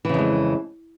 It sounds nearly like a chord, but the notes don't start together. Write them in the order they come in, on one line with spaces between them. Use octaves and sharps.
E3 C#3 F2 G#3